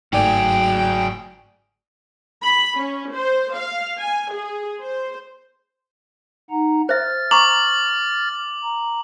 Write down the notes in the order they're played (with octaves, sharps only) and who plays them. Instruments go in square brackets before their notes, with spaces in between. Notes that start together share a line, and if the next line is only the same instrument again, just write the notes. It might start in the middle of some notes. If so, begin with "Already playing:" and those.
[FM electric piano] G1 D5 [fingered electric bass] G#2 A3 [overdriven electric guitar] F#3 G#4 [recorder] G5
[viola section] B5
C#4
C5
F5
G#5
G#4
C5
[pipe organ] D#4 F#5 A#5
[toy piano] C5 E5 [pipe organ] F6 A6
[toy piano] A#5 C#6 [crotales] D6 F#7
[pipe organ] A#5